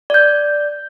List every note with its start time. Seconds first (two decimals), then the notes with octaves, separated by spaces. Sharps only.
0.10 D5 G6